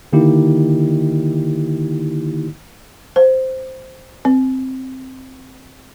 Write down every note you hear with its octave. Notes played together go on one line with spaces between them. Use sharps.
D3 D#3 A#3 D#4 E4 G4
C5
C4